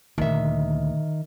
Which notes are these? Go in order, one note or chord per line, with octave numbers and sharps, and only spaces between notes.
D2 A#2 D#3 E5